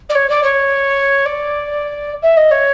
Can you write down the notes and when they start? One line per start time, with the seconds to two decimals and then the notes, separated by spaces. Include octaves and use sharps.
0.09 D5
0.15 C#5
0.29 D5
0.43 C#5
1.25 D5
2.22 E5
2.37 D#5
2.51 C#5